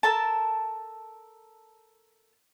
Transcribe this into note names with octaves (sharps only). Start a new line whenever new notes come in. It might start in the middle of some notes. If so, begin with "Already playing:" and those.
A4 A#4 A5